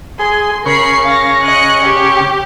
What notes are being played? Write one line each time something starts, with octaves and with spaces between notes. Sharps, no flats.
G#4 C6
C#3 A#4 B5 C#6 C7
F5 A#6
D#5 F#6 C#7
G4